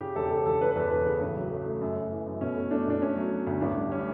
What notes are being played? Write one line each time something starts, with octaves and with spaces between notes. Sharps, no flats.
C#3 G4
E1 A4
G4
C#3 A4
E1 A4
E1 B4
B4
E2 A4
E1 B4
C#3
A1
F#3
A3
A3
F#2
F#2
E3
F#2
B2 C#4
A3
A3 D4
B2 D4
A3 C#4
F#3
F#3
D2
A1 D4
G3
A2 C#4